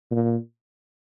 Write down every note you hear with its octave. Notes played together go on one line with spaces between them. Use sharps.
A#2